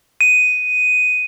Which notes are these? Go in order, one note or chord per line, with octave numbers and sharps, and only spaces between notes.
D#7